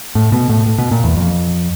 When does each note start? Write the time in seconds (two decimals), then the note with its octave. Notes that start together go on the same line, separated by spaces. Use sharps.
0.15 A2
0.32 B2
0.49 A2
0.66 A2
0.78 B2
0.91 A#2
1.04 E2
1.17 F2